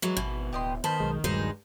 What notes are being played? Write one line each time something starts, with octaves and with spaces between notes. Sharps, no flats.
E3 F#3 G#3
G#1 B2 E3
D1 G4 D#5 C6
D#3 B4 C5 A5 B5
B1 G#3
D#1 G2 D#3 F#3 G#3 D#4 G#4 C5